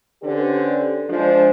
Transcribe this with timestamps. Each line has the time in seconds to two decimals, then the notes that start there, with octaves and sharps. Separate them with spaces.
0.23 D3 C#4 G4 B4 C5 D5
1.09 F3 G#3 D4 C5